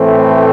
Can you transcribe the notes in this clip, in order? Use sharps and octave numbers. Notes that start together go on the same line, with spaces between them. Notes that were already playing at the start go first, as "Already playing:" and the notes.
Already playing: A2 E3 A3 C4